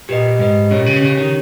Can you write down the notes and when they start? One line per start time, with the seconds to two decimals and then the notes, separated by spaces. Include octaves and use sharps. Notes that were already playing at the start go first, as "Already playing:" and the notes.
0.09 A#2 G4 B4 D#5
0.39 G#2 G4 B4 D#5
0.71 A#2 C#4 G4 C#5
0.86 C#3
1.02 C#3 C#4 G4 C#5
1.18 D#3